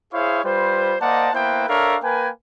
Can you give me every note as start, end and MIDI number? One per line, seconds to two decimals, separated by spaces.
0.13 0.43 64
0.13 0.43 68
0.13 0.43 72
0.13 0.43 73
0.13 0.43 77
0.13 0.43 85
0.44 0.96 55
0.44 0.96 65
0.44 0.96 71
0.44 0.96 72
1.00 1.29 58
1.00 1.29 72
1.00 1.29 74
1.00 1.29 75
1.00 1.29 78
1.00 1.29 81
1.34 1.67 58
1.34 1.67 59
1.34 1.67 64
1.34 1.67 71
1.34 1.67 72
1.34 1.67 79
1.68 1.97 62
1.68 1.97 69
1.68 1.97 70
1.68 1.97 73
1.68 1.97 76
1.68 1.97 77
2.02 2.29 58
2.02 2.29 70
2.02 2.29 71
2.02 2.29 79
2.02 2.29 80